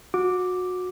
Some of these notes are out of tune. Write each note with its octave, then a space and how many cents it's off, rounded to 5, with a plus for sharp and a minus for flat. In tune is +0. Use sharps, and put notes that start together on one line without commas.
F#4 -25 D6 +0